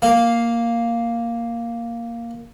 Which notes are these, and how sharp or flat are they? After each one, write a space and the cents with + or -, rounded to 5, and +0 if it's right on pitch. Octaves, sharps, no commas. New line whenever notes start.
A#3 +0 F5 +0